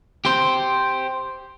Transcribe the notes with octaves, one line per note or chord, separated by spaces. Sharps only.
G4 C5